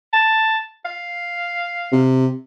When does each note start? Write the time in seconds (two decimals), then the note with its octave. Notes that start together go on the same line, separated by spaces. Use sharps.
0.13 A5
0.85 F5
1.92 C3